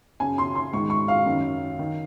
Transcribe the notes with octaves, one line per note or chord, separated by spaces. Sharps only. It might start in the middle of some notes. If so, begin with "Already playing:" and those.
F#2 C#3 G#5
C6
C6
G#2 D#3 C#6
C#6
F5
F#2 D#3
D#3